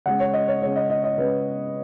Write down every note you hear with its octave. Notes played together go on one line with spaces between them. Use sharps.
C#3 G#3 F#5
C#5
D#5
C#5
C#3 G#3 C#5
D#5
D#5
D#5
C#3 G#3 B4